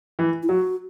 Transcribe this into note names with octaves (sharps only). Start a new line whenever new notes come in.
E3
E4
F#3 F#4